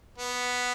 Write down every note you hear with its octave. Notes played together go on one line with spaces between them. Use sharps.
B3